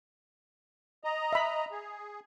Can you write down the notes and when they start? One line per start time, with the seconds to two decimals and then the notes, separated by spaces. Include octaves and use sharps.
1.04 D#5 A#5
1.33 E5 B5
1.71 G#4